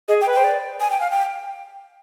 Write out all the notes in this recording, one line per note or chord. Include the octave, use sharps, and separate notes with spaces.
G#4 D#5
G5
B4
C5 G5
D5
G#5
G5
F5
G5